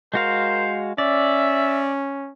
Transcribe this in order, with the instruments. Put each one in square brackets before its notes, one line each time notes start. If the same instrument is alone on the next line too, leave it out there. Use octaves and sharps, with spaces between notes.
[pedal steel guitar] G#3 F#4 F5 [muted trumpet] A#4 [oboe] C5
[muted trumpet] C#4 [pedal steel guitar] D5 [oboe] E5